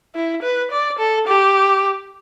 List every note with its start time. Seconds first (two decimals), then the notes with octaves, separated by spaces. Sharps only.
0.15 E4
0.43 B4
0.71 D5
0.99 A4
1.27 G4